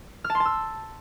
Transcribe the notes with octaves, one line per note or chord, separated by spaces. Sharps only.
F6
A5
C6
A5
E6